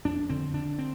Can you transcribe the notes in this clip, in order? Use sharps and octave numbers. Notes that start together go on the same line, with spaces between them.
F2 D4
D3 C4
D3 D4
C4